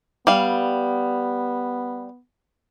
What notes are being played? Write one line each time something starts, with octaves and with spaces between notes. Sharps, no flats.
G3 B3 F5